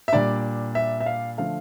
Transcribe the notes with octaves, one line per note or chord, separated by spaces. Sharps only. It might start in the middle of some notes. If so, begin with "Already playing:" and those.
E5
A#2 G3 D4 D5
E5
E5
F5
D3 F3 A3 F5